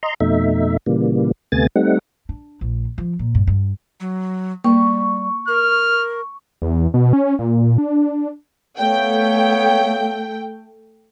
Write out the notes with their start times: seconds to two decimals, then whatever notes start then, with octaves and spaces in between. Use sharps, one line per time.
0.03 D#5 A#5 C6
0.21 F2 B2 A3 D#4 E5
0.86 A#2 C#3 E3 G3 A#3
1.52 D2 C3 A3 B3 G#5 A6
1.76 G3 A3 C4 D#4 F#5
2.29 D4
2.61 A#1
2.98 F3
3.19 A#2
3.35 G2
3.47 G2
4.00 F#3
4.64 G3 A#3 C#6
5.48 A#4 F6
6.62 E2
6.94 B2
7.13 C#4
7.39 A#2
7.78 D4
8.78 A3 B3 C#5 F5 G5